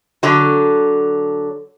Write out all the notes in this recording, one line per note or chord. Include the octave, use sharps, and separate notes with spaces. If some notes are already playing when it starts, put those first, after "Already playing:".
D3 F#3